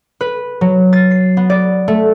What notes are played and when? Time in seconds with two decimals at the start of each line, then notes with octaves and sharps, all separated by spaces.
0.21 B4
0.61 F#3
0.93 A6
1.11 C7
1.37 B3
1.50 D5
1.88 A3